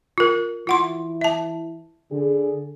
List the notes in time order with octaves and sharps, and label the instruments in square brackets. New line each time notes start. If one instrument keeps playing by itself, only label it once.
[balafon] F4 A#4
[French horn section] E3 E4 [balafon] F4 F#5 C6
[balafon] E5 A5
[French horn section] D3 G#4